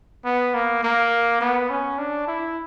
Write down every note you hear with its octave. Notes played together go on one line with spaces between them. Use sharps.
B3
A#3
A#3
B3
C#4
D4
E4